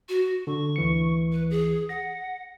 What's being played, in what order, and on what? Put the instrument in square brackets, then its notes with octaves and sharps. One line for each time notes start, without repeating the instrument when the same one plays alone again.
[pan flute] F#4
[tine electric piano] D3 [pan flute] C#6
[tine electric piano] D2 E3 C#7
[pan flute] B4
G#4
[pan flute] F#5 [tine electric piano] A#6